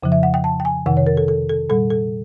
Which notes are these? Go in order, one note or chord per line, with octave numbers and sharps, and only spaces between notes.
F2 C#3 F3
E5
F#5
G5
A5
G5
G#5
F2 C3 D#3 F#5
C#5
A#4
A4
A4
A4
A#2 G3 A4
A4